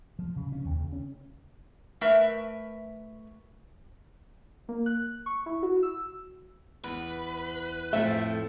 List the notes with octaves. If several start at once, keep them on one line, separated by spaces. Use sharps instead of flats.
F3
C#3
C#4
D#2
C#3
C#4
A3 A#4 B4 E5
A#3
F#6
C#6
E4
F#4
E6
E2 B4
F2 A2 F3 A3 A4 E5